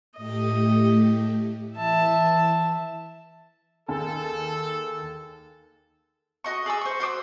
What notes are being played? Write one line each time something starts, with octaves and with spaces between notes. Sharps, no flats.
A2 A3 G4 D#5
E3 E5 A5
D#2 G#4 A4 A5
F#4 D#5 C#6
G#4 D5 G#5 E6
C5 C#6
F#4 C5 D6 E6